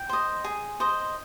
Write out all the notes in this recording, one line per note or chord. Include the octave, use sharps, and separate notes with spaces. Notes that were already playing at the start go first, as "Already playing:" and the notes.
Already playing: G5
C5 D#5
G#4
C5 D#5